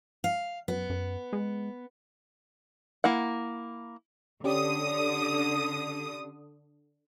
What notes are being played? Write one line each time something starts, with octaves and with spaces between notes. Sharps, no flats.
F5
F#2 B3
F#2
G#3
A#3 E4 F#5
D3 C#4 G4 D5 D#6